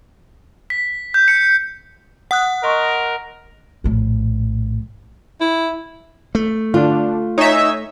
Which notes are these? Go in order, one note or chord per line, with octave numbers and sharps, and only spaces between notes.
B6
G6
C#7
F#5 D#6 F#6
A#4 D#5 C6 C#6
A#1 A2
E4
A3
D3 D4 F4
D#4 C#5 E5 G#5